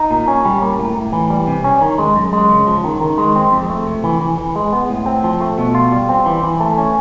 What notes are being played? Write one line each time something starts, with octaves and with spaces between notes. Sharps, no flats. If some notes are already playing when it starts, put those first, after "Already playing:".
Already playing: D#4
A#2
C#4
G3
A#3
A2
A2
E3
G3
C3
C#4
D#3
G#3
F#2
G#3
C#3
F3
D#3
D#3
G#3
C4
F2
A3
C3
E3
E3
E3
G#3
B3
A2
C4
F3
A3
B2
F4
G3
C4
E3
E3
A3
C#4